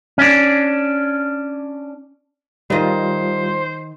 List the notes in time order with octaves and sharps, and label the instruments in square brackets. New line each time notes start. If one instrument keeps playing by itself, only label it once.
[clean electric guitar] C#4 D4
[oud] D#3 D#5 [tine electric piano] G3 F4 [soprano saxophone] C5